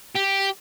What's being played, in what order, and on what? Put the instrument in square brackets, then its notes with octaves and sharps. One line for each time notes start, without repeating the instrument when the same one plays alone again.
[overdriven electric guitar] G4